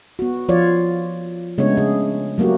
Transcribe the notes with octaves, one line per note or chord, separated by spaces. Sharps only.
B3 F#4
F3 F4 C#5 D5
C#3 G#3 A3 B3 D4 C#5
C#3 G#4
F#3 A3 A#3 F#4 G4